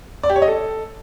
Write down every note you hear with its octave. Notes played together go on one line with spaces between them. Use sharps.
D5
G4
C#5
D#5
A4